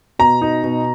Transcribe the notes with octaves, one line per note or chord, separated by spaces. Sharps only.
B2 A#5
D#4
B2